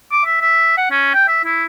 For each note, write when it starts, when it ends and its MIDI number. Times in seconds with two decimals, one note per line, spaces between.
0.12 0.24 86
0.26 0.41 76
0.41 0.73 76
0.77 0.90 78
0.91 1.14 61
1.14 1.27 79
1.28 1.41 76
1.45 1.65 64